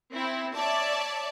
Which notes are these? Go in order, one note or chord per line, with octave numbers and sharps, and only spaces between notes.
C4 E4
C#5 D5 E5 A5